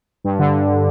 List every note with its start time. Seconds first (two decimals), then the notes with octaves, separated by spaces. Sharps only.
0.24 G2
0.39 D3